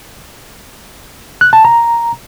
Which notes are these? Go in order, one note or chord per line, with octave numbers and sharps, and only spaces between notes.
F#6
A5
A#5